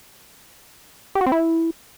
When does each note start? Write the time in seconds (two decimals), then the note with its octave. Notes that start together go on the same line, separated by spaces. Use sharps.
1.15 G4
1.21 F#4
1.26 C4
1.32 E4